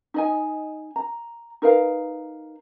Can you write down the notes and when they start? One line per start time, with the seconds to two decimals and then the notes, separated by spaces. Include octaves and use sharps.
0.14 D#4 D#5 G#5
0.96 A#5
1.62 D#4 A#4 B4 F5